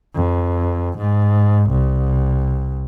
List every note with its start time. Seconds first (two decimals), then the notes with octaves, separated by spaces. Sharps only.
0.15 F2
0.98 G#2
1.70 C2